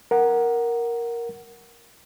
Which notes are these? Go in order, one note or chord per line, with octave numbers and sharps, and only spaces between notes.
A#4 F#5